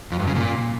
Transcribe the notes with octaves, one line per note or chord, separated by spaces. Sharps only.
F2
G2
C#3
A#2